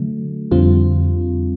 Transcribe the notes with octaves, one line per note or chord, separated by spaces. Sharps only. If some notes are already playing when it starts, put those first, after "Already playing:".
Already playing: D3 F#3 A3
F2 D3 G3 C4 F4